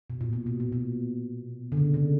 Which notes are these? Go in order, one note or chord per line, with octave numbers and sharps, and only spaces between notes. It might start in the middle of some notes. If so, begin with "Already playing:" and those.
B2
A#2
B2
B2
A#2
B2
D3
C#3
C#3